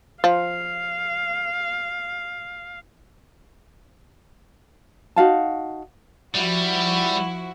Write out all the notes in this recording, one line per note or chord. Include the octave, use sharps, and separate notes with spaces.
F3 F5
D#4 F#4 F5 A5
F3 G3 E4 F#4